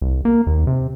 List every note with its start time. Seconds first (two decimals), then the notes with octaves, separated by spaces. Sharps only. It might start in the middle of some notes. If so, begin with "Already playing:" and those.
0.02 C2
0.25 A#3
0.47 D#2
0.67 C3